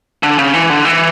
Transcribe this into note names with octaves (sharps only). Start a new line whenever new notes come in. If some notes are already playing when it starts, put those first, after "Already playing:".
D3
C#3
E3
D3
E3